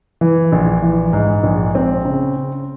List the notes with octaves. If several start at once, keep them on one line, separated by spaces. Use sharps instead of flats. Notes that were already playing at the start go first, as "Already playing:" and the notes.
E3
A#1
E3
G#2
A#1
C4
C#3
C#3